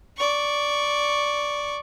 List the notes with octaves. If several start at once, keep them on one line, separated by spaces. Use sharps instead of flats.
D5 C#6